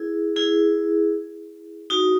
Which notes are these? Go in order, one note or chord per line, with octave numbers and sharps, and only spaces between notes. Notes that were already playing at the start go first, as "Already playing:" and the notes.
Already playing: E4 G#4
E4 G#4
D#4 F#4